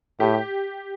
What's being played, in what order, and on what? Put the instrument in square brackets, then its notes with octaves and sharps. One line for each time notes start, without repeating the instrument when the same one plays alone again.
[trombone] A2 [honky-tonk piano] G4